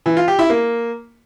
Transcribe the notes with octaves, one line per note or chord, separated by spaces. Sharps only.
E3
F4
G4
E4
A#3